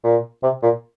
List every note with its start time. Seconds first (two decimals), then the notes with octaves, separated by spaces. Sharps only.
0.04 A#2
0.43 C3
0.63 A#2